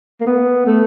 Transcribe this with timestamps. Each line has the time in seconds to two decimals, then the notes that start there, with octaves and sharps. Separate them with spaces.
0.21 A#3
0.27 B3
0.66 A3